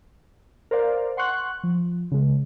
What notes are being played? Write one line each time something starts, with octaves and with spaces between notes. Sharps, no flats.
A#4 C5 D5 F5
F#5 C6 C#6 F#6
F3
C#3 G#3